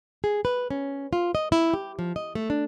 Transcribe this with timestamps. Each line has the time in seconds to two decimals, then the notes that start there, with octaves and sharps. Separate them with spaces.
0.24 G#4
0.45 B4
0.70 C#4
1.13 F4
1.35 D#5
1.52 E4
1.74 G4
1.99 F3
2.16 D#5
2.35 A3
2.50 D4